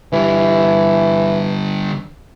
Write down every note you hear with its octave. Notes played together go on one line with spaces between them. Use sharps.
D3 E3 G3